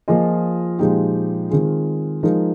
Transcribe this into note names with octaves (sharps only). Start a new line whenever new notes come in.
F3 A#3 F4 G#4 D#5
A#2 F3 G#3 D#4 G4
D#3 G#3 C4 F4 G#4
F3 G#3 D#4 A#4